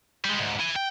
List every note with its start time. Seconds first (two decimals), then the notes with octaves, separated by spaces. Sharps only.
0.25 G3 G#3
0.39 D2 G#2
0.60 E4 G#5
0.76 G5